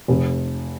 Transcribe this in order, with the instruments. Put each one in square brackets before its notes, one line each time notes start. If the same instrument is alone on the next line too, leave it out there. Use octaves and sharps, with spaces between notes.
[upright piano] F1